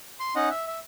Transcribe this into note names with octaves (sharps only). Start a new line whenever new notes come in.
C6
C#4 D#4 D#5 F#5
E5
E5